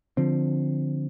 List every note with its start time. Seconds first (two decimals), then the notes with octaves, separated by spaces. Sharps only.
0.17 D3 F3 C4